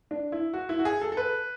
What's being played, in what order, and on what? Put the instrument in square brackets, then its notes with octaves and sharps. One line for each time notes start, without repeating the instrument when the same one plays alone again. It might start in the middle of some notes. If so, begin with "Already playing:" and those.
[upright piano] D4
E4
F#4
E4
F#4
G#4
A4
A4
B4